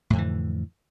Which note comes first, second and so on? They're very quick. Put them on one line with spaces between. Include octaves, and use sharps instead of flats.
A2 F2 D3 E3